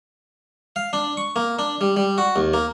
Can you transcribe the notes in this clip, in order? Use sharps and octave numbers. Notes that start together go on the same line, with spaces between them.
F5
D4
C#6
A#3
D4
G3
G3
F#4
D#2
A#3